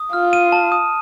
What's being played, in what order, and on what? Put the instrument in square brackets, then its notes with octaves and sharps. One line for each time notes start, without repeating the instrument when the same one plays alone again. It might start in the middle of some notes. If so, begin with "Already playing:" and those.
Already playing: [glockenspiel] D#6
[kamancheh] F4 [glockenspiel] F6
[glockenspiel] D#7
A5
D#6